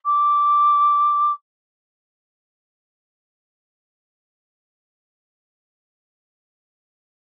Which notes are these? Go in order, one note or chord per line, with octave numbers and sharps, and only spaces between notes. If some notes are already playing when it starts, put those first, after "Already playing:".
D6